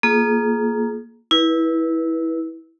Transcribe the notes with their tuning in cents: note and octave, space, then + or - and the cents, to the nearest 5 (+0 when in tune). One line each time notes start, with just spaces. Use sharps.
A#3 +0 F4 +0 G#4 +30
E4 -15 B4 -25